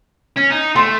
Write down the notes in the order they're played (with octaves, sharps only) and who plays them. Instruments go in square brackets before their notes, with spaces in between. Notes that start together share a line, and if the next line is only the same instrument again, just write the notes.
[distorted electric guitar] C#4
D#4
[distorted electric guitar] A3 [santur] C6